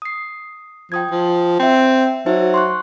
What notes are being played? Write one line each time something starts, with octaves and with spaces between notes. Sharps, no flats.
D#6 C7
F3 G5 D#6 G#6
F3
C4 E5 G5
F#3 D#4 C5 E5
C6 C#6 F#6